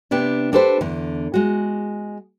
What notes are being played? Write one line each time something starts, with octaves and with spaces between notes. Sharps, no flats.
C3 B3 D4 G4
D4 G4 A4 B4 C5
E2 D3
G#3 F#4